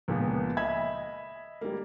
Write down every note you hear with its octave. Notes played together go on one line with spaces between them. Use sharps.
C#2 A#2 F3 B3
D#5 E5 B5 G#6
G3 A#3